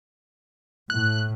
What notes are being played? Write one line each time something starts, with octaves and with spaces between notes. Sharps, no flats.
A2 F#6